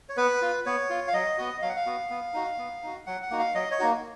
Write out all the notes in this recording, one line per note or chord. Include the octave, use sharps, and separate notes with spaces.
C#5
B3 B4
F4
B3 C#5
F4
F5
F#3 D#5
B3 F#4
F#3 F5
F#5
F5
B3 F#4
B3
D#4 F#4
B3
D#4 F#4
F#3 F#5
F#5
A#3 D#4 F#4
F5
F#3 D#5
C#5
A#3 D#4 F#4